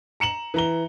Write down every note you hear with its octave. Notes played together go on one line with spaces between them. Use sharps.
A#5 C#7 E7 F#7
E3 A#5 G7